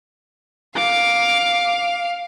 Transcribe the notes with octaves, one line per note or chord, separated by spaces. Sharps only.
F5 D6